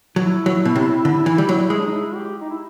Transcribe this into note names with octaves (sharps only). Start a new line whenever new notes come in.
F#3 E4
F#3
B2
C3
D3
E3
G3
F#3
G#3
D4
D#4
E4
G4
D#4
E4